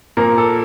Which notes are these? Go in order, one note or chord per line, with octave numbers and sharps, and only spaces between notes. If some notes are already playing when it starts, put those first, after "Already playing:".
A#2 F3 A#3 A#4
A4